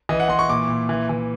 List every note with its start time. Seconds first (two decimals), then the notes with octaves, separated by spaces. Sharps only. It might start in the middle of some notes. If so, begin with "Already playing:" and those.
0.09 E3 D#5
0.20 F#5
0.29 E3 C6
0.39 C#6
0.49 A#2 D6
0.68 A#2
0.89 E3
1.09 E3